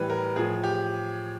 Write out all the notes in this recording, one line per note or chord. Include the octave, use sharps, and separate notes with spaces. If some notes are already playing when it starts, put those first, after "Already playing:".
Already playing: A2 E3 G3 B4
A#4
A2 F3 G#4
G4